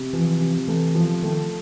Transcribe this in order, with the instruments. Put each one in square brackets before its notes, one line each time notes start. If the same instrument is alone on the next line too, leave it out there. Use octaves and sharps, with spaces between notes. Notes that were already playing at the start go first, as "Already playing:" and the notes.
Already playing: [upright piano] C3
[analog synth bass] E3 [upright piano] F3
[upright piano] C3
[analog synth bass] E3 [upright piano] A3
[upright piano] F3
[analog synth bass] D#3 [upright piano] A3